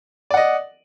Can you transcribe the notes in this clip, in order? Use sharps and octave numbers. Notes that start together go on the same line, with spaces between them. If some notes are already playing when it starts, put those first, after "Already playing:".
D5 D#5 F#5